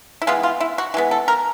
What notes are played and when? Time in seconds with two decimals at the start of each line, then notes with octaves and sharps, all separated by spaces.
0.22 E4
0.27 E3 G#3 B3 F4
0.43 F4
0.60 E4
0.78 F#4
0.94 E3 G#3 B3
1.11 A4
1.28 A#4